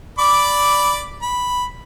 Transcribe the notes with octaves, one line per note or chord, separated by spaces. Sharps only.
D5 B5 D6
B5